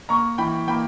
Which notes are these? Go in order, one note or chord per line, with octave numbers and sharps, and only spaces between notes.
A#3 A#5 C#6
E3 G5 B5
A#3 G5 B5